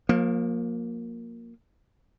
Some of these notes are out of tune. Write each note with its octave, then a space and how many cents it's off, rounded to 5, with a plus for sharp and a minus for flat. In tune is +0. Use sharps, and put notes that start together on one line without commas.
F3 +35 A#3 +0